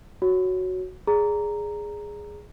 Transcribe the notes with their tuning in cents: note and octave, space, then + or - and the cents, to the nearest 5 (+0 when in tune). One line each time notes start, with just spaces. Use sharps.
F#4 +0 C#5 +0
G#4 +0 D5 -20 A#5 -5